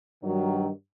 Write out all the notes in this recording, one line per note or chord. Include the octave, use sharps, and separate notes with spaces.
G2 D#3 F#3